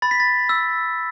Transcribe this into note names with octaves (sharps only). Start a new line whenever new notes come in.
B5 A6
B6
A6
E6